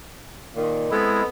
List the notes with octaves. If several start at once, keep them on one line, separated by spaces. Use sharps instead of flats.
A#2 D#3
G#3 B3 C4 E4 A4